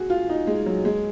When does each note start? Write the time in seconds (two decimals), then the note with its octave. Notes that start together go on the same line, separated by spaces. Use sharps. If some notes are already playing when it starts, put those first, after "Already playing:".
Already playing: F#4 G#4
0.10 F4
0.29 D#4
0.47 G#3
0.66 F#3
0.85 G#3